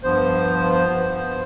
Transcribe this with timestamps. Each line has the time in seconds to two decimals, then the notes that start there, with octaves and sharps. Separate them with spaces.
0.03 G2 F3 B3 C5
0.88 G2 F3 B3